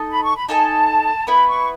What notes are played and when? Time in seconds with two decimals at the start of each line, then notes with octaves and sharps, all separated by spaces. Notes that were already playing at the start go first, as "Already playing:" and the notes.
Already playing: D#4 A4 D#5 A5
0.10 B5
0.23 C#6
0.35 B5
0.48 D#4 A4 D#5 G#5 A5
1.27 B3 E4 B4 B5
1.47 C#6